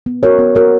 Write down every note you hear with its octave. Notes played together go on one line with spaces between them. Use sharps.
B3
F#4 A#4 C#5
B3
F#4 A#4 C#5